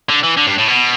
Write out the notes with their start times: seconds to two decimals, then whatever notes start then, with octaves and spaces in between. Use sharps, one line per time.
0.09 D3
0.24 E3
0.37 D3
0.47 G2
0.59 A2
0.68 B2